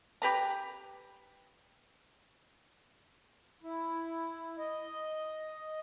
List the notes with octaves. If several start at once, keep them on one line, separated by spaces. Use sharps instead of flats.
G4 B4 A#5
E4
D#5